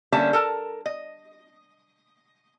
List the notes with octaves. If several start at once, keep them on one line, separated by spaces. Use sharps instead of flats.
D3 G3 A#3 C#4 E5 A5
A4 A#4 A5
D#5